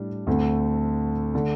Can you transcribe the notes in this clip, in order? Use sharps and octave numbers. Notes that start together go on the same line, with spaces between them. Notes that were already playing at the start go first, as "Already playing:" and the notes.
Already playing: A2 G3 D4
D2 D3 A3 C4
D3 A3 D4